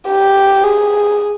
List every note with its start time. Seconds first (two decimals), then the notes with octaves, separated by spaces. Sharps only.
0.08 G4
0.64 G#4